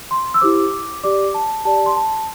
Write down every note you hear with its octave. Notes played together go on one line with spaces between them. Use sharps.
C6
E6
E4 G4 C5 D6
G4 D5 D6
A5
G4 D5 A5
C6
A5